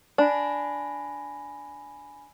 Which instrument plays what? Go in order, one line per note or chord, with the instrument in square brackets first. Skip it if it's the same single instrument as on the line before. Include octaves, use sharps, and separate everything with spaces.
[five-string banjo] D4 [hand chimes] G#5 B5 A#6